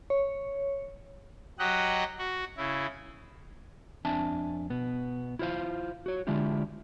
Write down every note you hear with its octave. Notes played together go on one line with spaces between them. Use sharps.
C#5
F#3 G4 D#5 F#5
F#4
C#3 E4
F2 C4 D4 E5 G#5 A5
B2 B3
E4 F4 C5 F5
F#4 C#5
D3 G#3 D4 E4 F4 G4